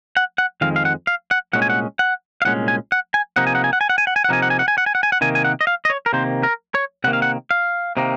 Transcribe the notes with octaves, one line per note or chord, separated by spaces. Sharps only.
F#5
F#5
F2 D#3 G#3 F5
F5
F#5
F5
F#5
C2 A#2 G#3 C#4 F#5
G#5
F#5
F#5
F5
C2 A#2 G#3 C#4 F#5
G#5
F#5
G#5
C3 F3 A#3 D#4 F#5
G#5
F#5
G#5
F#5
G#5
F#5
G#5
F#5
G#5
F#5
C3 F3 A#3 D#4 G#5
F#5
G#5
F#5
G#5
F#5
G#5
F#5
G#5
F#5
C3 D#3 A#3 G#5
G#5
F#5
D#5
F5
D#5
C#5
A#4
C3 D#3 A#3 C5
A#4
C#5
C3 D#3 A#3 F#5
F5
F#5
F5
C3 D#3 A#3